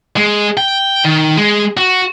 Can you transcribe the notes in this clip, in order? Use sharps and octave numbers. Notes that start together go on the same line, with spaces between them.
G#3
G5
D#3
G#3
F#4